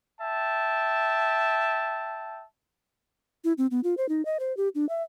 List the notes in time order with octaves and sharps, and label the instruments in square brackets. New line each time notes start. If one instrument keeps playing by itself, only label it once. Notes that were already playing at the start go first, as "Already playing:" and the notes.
[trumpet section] E5 G5 A5
[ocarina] E4
C4
B3
F4
C5
D#4
D#5
C5
G4
D4
E5